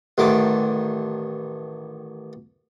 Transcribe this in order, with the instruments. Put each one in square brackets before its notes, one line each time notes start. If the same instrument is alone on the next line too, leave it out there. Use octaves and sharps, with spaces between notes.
[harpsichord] A1 D3 D#3 D6